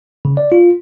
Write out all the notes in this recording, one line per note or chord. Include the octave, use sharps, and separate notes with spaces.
C#3
D5
F4